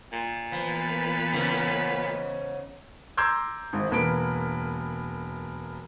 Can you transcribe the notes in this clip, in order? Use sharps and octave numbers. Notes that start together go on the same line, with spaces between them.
A#2
E3 F3 B3 B4
G#2 C#3
A#5 C6 D6 E6 G6 G#6
G#1 G#2
E1 A#3 B4 D7